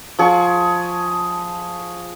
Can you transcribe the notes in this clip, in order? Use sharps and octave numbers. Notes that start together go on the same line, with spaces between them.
F3 G#4 C#6